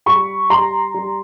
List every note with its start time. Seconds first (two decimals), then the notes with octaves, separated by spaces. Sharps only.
0.06 G3 B5 C#6
0.50 G3 A#5 C6
0.94 G3